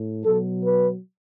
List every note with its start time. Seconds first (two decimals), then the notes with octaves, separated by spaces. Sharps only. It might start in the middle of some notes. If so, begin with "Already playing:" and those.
Already playing: A2
0.25 B2 F#3 A4
0.63 B4